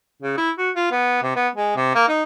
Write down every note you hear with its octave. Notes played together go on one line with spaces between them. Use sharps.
C#3
E4
F#4
F4
B3
C3
B3
G#3
C3
A#3
D#4